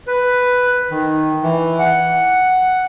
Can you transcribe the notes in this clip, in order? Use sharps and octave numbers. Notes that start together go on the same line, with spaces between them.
B4
D#3
E3
F#5